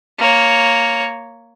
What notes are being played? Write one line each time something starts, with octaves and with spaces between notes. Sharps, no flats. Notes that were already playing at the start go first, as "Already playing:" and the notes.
A#3 C#5